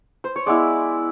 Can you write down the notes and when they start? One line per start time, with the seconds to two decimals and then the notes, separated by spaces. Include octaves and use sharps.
0.24 C5
0.36 C#5
0.46 G#3 B3 E4 D5